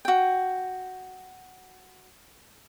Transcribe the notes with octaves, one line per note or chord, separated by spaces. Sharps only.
F#4 G5